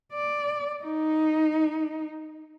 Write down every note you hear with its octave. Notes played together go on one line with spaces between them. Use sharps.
D5
D#4